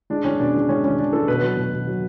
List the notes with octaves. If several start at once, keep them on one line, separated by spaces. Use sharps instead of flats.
G#3 D4
G#3 C#4
B2 D4
G#3
G#3 C#4
G#3 C#4
G#3 D4
G#3 A4
B2 B4
F#3
B2
B2
F#3